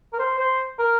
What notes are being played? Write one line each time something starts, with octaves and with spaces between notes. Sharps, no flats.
A#4
C5
C5
A#4